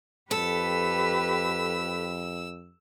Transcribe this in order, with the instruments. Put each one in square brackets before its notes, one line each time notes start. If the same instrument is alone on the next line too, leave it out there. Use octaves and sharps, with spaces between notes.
[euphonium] F2 [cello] G4 B4 [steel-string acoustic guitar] A4 [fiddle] E6